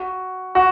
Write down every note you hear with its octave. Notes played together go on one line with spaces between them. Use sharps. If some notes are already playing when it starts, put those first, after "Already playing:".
Already playing: F#4
F#4